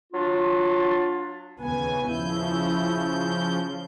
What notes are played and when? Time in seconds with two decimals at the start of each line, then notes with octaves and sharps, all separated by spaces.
0.13 F#3 D4 F4
1.59 D#2 C#3 B3 G#5
2.08 C#3 F3 E4 G6